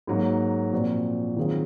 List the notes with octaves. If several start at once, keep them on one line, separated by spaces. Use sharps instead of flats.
G#2 F#3 A#3
A#2 F3 C4 F#4
D#3 F#3 C4 F4 G#4